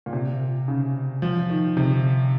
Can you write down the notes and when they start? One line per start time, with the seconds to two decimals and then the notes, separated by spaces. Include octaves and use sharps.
0.06 A#2
0.13 C3
0.68 C#3
1.22 F3
1.50 D#3
1.77 C3